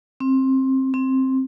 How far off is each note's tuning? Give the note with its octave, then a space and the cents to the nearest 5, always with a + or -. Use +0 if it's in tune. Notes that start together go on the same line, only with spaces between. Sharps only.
C4 +20
C4 +10